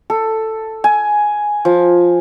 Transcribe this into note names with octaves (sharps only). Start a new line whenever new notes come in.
A4
G#5
F3